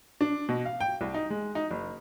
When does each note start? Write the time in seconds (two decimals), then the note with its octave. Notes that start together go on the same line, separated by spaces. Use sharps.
0.21 D4
0.49 B2
0.65 F5
0.81 G5
1.01 C2
1.14 D#4
1.30 G#3
1.55 D#4
1.71 F#1